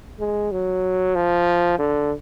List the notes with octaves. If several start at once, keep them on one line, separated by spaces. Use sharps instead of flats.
G#3
F#3
F3
D3